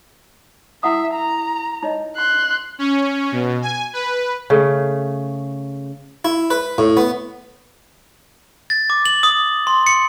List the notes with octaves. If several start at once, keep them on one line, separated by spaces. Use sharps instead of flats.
E4 E5 F#5 D#6
A#5
D#4 C#5 D#5
C6 F#6
C#4
B2
G#5
B4
C#3 A3
E4
B4
A2
B3
A6
D6
F#7
D#6
C6
C#7